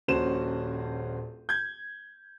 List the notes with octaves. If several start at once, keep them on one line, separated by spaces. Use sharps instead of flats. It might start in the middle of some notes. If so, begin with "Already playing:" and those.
D#1 A#1 C#4 F#4 C5 E7
G6 G#6